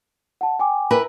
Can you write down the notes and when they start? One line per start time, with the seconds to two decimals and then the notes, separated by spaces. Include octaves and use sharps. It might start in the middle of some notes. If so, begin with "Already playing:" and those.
0.41 F#5 A5
0.59 G5 G#5 D6
0.91 E4 A#4 B4